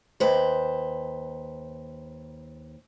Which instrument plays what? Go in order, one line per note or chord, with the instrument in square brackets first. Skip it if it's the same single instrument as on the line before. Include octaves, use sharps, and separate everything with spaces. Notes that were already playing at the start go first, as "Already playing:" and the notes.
[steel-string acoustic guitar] D#2 B4 C5